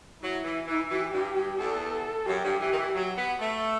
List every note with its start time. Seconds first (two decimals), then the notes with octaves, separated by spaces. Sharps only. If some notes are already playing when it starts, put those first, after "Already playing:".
0.22 F#3 E4
0.44 E3
0.67 E3
0.90 E3 G4
1.13 G2
1.35 G2
1.58 E2 A4
2.26 F#2 G4
2.43 G2
2.60 E3
2.72 D#3
2.77 E3
2.95 F#3
3.17 B3
3.40 A3